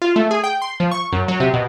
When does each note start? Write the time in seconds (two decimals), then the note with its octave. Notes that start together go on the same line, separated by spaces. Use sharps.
0.02 F4
0.16 A3
0.31 G#4
0.44 G5
0.62 C6
0.80 F3
0.91 C#6
1.12 F#2
1.28 F#3
1.40 C3
1.54 B2